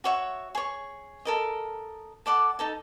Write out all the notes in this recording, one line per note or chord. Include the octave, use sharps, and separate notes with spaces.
F#4 C#5 E5
G#4 C#5
A4 A#4 D#5
A4 D5 F#5 D6
D#4 A4 A5